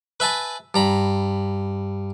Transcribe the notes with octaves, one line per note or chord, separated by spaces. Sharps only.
B4 E5 G#5 A5 B5
G2 A#5 B5